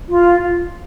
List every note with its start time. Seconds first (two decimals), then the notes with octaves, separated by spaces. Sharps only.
0.08 F4